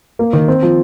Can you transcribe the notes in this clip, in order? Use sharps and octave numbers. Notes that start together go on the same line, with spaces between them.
A#3
D#3
C4
F3